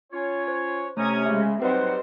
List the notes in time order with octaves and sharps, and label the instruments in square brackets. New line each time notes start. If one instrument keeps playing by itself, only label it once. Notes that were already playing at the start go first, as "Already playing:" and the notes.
[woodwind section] C#4 F4 C#5
[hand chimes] C5
[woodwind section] C3 C#4 [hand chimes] A3 [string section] A#5 D#6 G#6
[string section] C#3 G#3 [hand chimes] E5
[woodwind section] F#3 D#4 F#5 [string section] G3 C4 C5 [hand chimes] B4 D#5